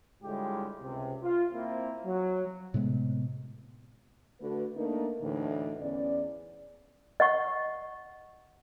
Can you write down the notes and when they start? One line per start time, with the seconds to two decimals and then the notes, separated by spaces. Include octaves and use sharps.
0.23 A2 D3 G3 G#3 F4 G4
0.82 C#2 C3
1.23 F4
1.52 A#3 C4 E4
2.05 F#3
2.74 A2 C3 G#3 B3
4.40 D3 A3 F#4 B4
4.77 A3 A#3 D4 D#4 A#4
5.22 D2 A2 D3 E3 D#4
5.81 E2 C#4 D5
7.20 D#5 F#5 C#6